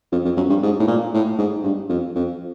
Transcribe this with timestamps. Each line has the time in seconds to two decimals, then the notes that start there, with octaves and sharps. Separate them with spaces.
0.12 F2
0.25 F2
0.37 F#2
0.50 G2
0.63 G#2
0.80 A2
0.88 A#2
1.14 A2
1.38 G#2
1.64 G2
1.90 F2
2.15 F2